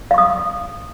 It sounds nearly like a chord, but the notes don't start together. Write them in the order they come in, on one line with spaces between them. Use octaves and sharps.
F5 C#6 D#6